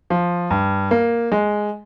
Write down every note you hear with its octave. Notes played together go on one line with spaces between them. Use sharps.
F3
G2
A#3
G#3